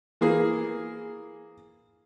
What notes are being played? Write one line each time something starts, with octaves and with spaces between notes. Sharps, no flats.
E3 A#3 G#4